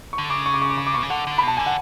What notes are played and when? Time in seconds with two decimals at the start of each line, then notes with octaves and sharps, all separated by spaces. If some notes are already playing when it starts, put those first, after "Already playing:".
0.13 C#6
0.18 D3
0.29 C#3 D6
0.46 C#6
0.54 D6
0.62 C#6
0.70 D6
0.78 C#6
0.87 D6
0.94 B2 C#6
1.03 C#3
1.10 D3 F#5
1.27 D3
1.38 B5
1.43 B2 A5
1.57 D3 G#5
1.66 F#5